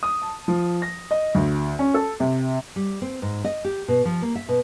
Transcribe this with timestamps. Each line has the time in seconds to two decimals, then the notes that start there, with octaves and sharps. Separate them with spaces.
0.03 D#6
0.22 A5
0.48 F3
0.82 A#6
1.11 D#5
1.35 D2
1.79 C#4
1.94 A4
2.20 C3
2.76 G3
3.02 C4
3.22 G#2
3.44 D#5
3.65 G4
3.88 B2
4.05 F3
4.22 A#3
4.35 E5
4.49 B2